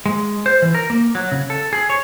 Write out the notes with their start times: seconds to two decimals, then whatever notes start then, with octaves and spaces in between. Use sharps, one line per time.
0.06 G#3
0.46 C5
0.62 E3
0.75 A#4
0.90 A#3
1.15 F#3
1.32 C#3
1.50 A4
1.73 G#4
1.90 C#5